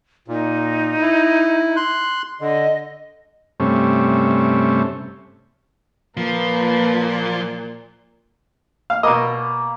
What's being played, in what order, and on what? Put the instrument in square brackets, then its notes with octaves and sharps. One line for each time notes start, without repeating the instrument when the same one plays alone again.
[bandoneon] A#2 [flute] D#4
[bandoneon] E4
C6 F#6
[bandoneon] D3 [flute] D#5
[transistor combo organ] G2 C3 A3 C#4
[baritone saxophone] A#2 [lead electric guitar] F3 [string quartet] A#3 [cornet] B4
[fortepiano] F5
[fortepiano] B2 D#5 [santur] A#3 B5 E6